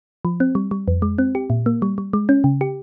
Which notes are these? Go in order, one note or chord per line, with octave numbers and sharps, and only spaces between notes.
F3
C4
G3
G3
F2
G#3
C4
G4
A#2
A#3
G3
G3
G#3
C#4
C#3
G4